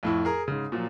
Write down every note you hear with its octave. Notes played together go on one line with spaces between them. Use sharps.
F2 A2 E4
G#4 A#4
G#2 C#3
A#2 F3 F#3